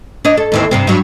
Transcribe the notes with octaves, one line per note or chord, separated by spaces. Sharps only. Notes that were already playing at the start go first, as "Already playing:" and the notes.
D4 C#5 D#5
A4
D#2 E3 C4
G2 C3 C4
G2 F#3